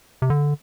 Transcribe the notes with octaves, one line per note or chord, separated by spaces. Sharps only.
C3
D3